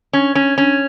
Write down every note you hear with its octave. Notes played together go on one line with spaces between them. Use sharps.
C#4
C#4
C#4